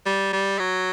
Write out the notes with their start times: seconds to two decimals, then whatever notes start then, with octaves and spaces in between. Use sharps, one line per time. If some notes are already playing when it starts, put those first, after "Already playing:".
0.06 G3
0.33 G3
0.59 F#3